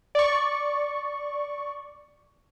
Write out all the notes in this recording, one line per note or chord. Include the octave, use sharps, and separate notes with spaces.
D5 C#6